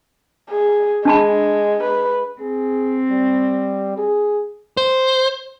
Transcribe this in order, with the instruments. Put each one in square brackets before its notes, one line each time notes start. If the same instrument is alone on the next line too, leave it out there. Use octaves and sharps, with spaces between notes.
[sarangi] G#4
[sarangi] G#3 [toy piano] D4 A5 B5
[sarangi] B4
[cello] C4 [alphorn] G#4
[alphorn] G3
G#4
[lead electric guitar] C5